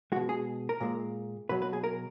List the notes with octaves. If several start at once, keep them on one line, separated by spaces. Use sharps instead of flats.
B2 G#3 F#4
G#4
A#4
A#2 G#3
B2 F#3 B4
B4
G#4
A#4